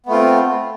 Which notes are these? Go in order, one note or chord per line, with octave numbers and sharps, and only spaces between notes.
A3 B3 C4 F4